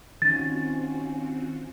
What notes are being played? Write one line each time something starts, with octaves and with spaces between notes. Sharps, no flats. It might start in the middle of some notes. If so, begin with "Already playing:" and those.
D#3 C4 C#4 F4 F#4 A6